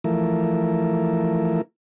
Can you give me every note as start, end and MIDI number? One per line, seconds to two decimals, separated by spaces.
0.04 1.62 52
0.04 1.62 53
0.04 1.62 57
0.04 1.62 64
0.04 1.62 70